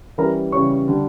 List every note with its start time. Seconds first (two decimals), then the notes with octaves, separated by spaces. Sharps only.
0.18 E3 G3 C#4 E4 A#4 A#5
0.52 C#3 E3 G3 C#4 C#5 C#6
0.88 D3 G3 D4